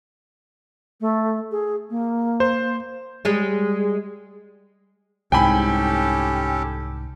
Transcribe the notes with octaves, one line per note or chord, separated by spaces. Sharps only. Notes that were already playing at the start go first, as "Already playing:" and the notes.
A3
G#4
A#3
C5
G3 G#3
C2 G#2 C#4 G4 A4 G5 G#5 B5